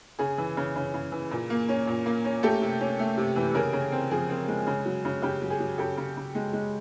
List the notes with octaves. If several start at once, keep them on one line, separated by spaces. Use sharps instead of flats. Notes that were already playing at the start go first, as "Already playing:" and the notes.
C#3 G#4
E3
C#3
C#3
C#3
E3
A#2
A#3
C#4
A#2
A#3
C#4
A3 G4 A4
C3
C#4
A3
C3
E3
C#3 G#4 A#4
C#3
C4
F3 G#4
C4
G#3
C#3
F#3
C#3
C#3 G4
F#3
G#4
F#3
C#3 G4 A4
C#3
C#3
G#3
G#3